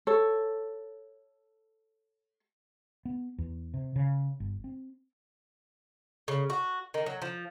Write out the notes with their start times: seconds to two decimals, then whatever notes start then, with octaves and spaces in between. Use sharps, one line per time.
0.07 A4 C#5
3.05 B3
3.38 E2
3.74 C3
3.96 C#3
4.40 G1
4.64 C4
6.28 C#3
6.50 F#4
6.94 D#3
7.06 F#3
7.22 F3